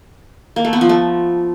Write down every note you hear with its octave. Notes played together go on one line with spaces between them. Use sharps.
A#3
A3
B3
F3
A3